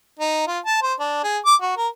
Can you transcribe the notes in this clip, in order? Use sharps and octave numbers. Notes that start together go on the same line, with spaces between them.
D#4
F4
A5
C5
D4
G#4
D6
F#4
A#4